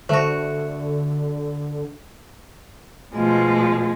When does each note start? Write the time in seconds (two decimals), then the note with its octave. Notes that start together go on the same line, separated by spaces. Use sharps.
0.09 D3 A3 F#4 C5
3.15 B2 F3 G#3 A3 D#5